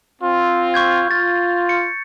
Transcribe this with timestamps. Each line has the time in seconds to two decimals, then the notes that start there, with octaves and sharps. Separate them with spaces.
0.22 C4 F4
0.74 C#6 G6 G#6
1.11 F4 A6
1.69 C#7